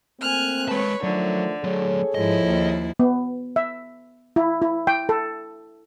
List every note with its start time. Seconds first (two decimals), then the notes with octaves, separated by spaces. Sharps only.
0.20 A3 A#3 C4 G#5 F6 F#6
0.69 G#3 B4 C#5 A5
1.03 D3 D#3 F3 F#3 A3
1.64 F#3 A3 G#4 A4 C#5
2.15 G#2 F3 E4 D#5
2.44 D#2
2.99 B3
3.56 E5
4.36 E4
4.62 E4
4.87 G5
5.09 A4